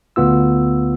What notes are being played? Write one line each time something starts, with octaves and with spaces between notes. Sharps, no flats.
D2 B3 F4 E6